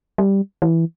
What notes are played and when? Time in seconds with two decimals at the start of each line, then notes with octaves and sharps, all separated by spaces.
0.18 G3
0.62 E3